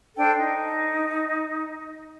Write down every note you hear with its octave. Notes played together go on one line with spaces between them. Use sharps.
D4 A4 C5 G5
D#4